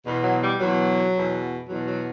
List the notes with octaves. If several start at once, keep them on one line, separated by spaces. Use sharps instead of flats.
E2 B2
F#3
G3
E2 B2 F#3
E2 B2
E2 B2 F#3
F#3